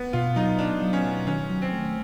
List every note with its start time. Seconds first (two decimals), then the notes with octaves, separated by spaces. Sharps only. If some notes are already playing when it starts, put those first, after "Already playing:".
Already playing: B3
0.13 B2 F4
0.36 F#3 D#4
0.59 B3 D4
0.82 F#3
0.93 C#4
1.04 B2
1.27 D#3 C#4
1.50 F#3
1.62 C4
1.72 A3